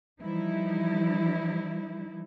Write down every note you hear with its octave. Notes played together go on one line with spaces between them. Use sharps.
E3 F3 G3 D#4 E4